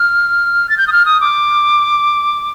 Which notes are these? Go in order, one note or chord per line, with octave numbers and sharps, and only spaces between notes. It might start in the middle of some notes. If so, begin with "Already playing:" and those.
Already playing: F6
A6
G6
D#6
F6
D#6
D6